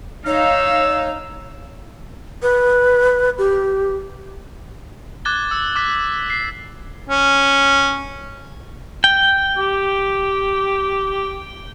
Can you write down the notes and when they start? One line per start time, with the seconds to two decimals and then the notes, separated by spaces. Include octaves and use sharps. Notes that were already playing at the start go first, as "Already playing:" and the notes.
0.26 D#4 C#5 F5 E6
2.43 B4
3.38 G4
5.25 D6 F#6 G#6 A6 G7
5.51 E6
5.76 D6 F#6 B6
6.30 C7
7.09 C#4
9.04 G5
9.58 G4